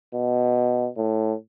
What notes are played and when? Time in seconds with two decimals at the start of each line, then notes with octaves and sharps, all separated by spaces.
0.14 B2
0.97 A2